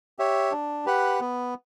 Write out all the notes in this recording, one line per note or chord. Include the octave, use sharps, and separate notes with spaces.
G4 C#5 E5
D4
G4 B4 F#5
B3